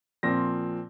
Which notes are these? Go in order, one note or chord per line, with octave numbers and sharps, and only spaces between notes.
A#2 F3 C4 A#6